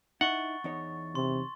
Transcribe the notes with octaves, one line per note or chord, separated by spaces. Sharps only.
D#4 E4 F#5 C#6 A6
E2 D#4 C#5
C3 C6